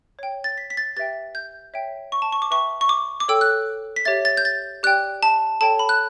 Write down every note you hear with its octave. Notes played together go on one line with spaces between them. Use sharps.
C#5 G5
A6
B6
B6
A6
G4 B4 E5 G5 A6
G6
C#5 E5 G5
C#6
A5
C#6
D6
B4 E5 G5 C#6
C#6
D6
D6
A4 C#5 G5 E6
F#6
B6
G4 C#5 E5 A6
A6
G6
A6
G4 D5 G5 F#6
A5
A4 C#5 G5 A5
B5
F#6